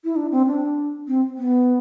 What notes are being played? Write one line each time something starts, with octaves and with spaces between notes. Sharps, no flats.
E4
D4
C4
D4
C4
B3